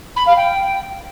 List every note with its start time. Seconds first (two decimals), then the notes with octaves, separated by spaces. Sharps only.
0.16 B5
0.26 F5
0.36 G5